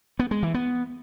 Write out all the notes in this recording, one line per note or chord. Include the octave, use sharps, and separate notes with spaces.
B3
G#3
E3
B3